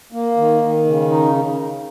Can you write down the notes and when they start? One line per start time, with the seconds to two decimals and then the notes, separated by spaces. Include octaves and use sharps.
0.12 A#3
0.37 D#3
0.62 D#3
0.86 C#3
1.10 D#4